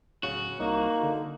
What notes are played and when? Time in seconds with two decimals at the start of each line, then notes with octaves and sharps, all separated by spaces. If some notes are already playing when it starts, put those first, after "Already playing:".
0.23 D1 C#3 F#4
0.60 C2 A#3 D#4
1.03 D3